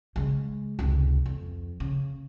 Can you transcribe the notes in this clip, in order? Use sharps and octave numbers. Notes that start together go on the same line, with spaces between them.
C#3 G#3
F1 C#2
F2
C#3